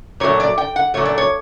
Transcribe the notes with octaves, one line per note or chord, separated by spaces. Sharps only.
A#2 F#3 A3 C#5
D5
G5
F#5
A#2 F#3 A3 C#5
D5
C#5